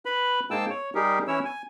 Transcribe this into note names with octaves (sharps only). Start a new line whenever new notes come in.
B4 B5
G#2 G#3 A#3 G5 A5 E6
C#5
G3 D#4 G4 G#4 A#4
E3 C#4 E4 C#5 E6
G#5